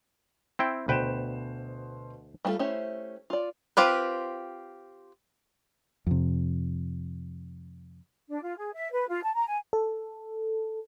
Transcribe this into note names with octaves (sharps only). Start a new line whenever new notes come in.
C4 E4 G5
D2 B2 B4 C5 G5 E7
G3 A3 C4 F4 A4
A3 C#4 E4 G4 C5
F4 D5
C4 F4 G4 B4
F2 C3
D4
F4
G#4
E5
B4
F4
A5
A#5
G#5
A4